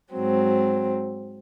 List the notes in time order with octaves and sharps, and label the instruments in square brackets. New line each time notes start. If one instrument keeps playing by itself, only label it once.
[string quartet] G#2 F#3 C4